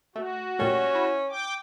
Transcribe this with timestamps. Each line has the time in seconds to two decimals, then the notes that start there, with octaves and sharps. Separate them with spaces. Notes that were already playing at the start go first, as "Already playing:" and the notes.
0.16 A3 F#4
0.59 A#2 G3 A3 C#4
0.95 E4
1.30 G5 D6